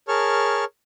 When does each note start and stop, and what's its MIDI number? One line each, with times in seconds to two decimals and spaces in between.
0.08 0.65 68
0.08 0.65 70
0.08 0.65 73
0.08 0.65 81
0.08 0.65 85
0.08 0.65 89